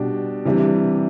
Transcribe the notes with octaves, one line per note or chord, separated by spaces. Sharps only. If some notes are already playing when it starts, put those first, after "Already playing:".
Already playing: B2 G3 D4 G4
C3 E3 G3 D4